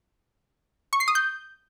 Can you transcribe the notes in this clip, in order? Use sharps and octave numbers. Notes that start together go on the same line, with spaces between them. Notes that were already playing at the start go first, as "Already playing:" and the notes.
C#6
C7
D#6
G6